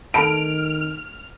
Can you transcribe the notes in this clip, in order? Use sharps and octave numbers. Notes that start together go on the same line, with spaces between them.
D#3 A3 A4 B5 F6 D7